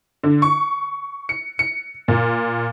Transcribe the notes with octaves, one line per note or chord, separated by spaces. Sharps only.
D3
C#6
C#7
C#7
A#2